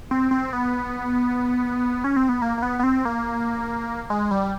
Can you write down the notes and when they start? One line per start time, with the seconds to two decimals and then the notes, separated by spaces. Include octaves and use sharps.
0.11 C4
0.31 C4
0.53 B3
2.04 C#4
2.16 C4
2.29 B3
2.42 A#3
2.58 A#3
2.62 B3
2.79 B3
2.83 C4
3.05 A#3
4.10 G#3
4.31 G3